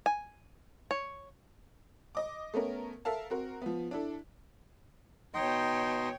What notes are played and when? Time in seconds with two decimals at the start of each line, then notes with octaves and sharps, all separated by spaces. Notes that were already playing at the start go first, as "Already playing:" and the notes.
0.06 G#5
0.91 C#5
2.15 D#5 D6
2.54 A3 B3 C#4 A#4
3.05 A4 A#4 E5 F5 A5
3.30 C4 F#4 A#4
3.62 F3 B3
3.91 D4 E4 A4
5.34 B2 D#4 C#5 D#5 G5 C6